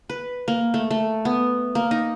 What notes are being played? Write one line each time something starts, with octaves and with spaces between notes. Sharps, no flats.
B4
A#3
A3
A3
B3
A#3
D#4